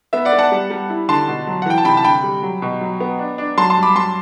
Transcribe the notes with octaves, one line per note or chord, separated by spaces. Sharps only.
B3 E5
D5 F#5
B3
F#5 A5
G3
G3
E4
D3 A5 C6
B2
F#3
F#5
E3 G5
A5
C3 G5 B5
A5
D3 G5 B5
G3
F#3
B2
F#3
B3
D4
D4
F#3 A5 C6
A5 C6
G2
B5 D6
F#3 A5 C6